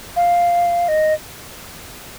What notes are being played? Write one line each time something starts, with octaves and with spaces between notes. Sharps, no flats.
F5
D#5